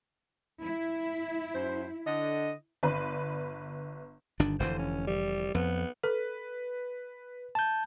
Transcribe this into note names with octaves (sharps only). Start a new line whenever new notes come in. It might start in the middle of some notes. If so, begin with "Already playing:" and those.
E4
F#2 C5
D3 D#5
G1 B4 D5 B5 C6
G1 D#3 D4
F1 D3 E3 C5
C#4
G3
F2 B3
A4 B4
A5 G6